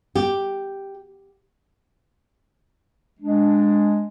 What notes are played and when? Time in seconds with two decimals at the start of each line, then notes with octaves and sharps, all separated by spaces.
0.15 G4
3.20 G#3 D4